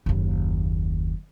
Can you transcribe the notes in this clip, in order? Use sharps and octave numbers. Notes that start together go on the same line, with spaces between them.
F#1 D#2